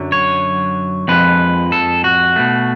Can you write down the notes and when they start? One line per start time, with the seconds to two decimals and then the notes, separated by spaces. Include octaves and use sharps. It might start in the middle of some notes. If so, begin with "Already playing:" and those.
Already playing: F#2 D3 F#3
0.12 C#5
1.08 F2 F3 G#3 B4
1.72 A4
2.04 F#4
2.36 B2 A3